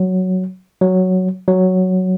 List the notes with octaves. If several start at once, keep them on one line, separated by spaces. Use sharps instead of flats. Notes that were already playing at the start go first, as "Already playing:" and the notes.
Already playing: F#3
F#3
F#3